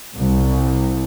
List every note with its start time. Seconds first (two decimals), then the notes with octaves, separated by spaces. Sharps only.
0.15 C2